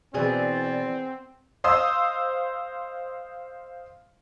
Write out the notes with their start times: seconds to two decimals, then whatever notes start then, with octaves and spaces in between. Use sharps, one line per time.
0.14 B2 E3 B3 C4 G#4 D5
1.64 C5 D#5 F5 C6 D#6 E6